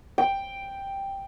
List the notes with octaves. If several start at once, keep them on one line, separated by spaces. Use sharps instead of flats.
G5